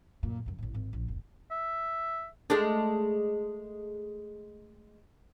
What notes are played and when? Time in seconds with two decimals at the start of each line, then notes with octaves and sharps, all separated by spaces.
0.23 F#2 A#2
0.46 F#2 C#3
0.58 A1 A2
0.73 G#1 G#2
0.93 A#1
1.07 F1 D2
1.51 E5
2.50 G#3 A3 D4